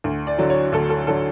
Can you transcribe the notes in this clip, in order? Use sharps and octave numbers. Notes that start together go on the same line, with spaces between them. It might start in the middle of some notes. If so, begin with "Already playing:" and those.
D2
D5
D3 F#3
C#5
D2 A4
A4
D3 F#3 A4